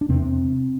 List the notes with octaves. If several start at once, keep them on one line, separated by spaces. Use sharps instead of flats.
D4
E2 C3 C4